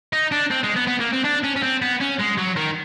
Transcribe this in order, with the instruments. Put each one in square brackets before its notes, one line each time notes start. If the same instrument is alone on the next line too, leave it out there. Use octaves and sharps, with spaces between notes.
[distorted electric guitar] D#4
D4
C4
G#3
B3
B3
A#3
C4
D4
C#4
C#4
C4
B3
C#4
G#3
F#3
D#3